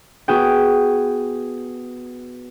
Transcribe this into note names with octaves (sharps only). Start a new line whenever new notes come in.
B3 F#4 G#4 G5